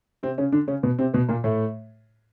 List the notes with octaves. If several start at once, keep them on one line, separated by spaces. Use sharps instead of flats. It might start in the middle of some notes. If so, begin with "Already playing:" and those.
C3 C4
C#3 C#4
D3 D4
C#3 C#4
B2 B3
C3 C4
B2 B3
A#2 A#3
A2 A3